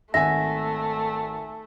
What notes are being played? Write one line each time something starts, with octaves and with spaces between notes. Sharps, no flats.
G#1 A3 E5 F#5 G#5 A#6